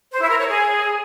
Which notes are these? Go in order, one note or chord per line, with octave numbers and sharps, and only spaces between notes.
C5
E4
A#4
C#5
G#4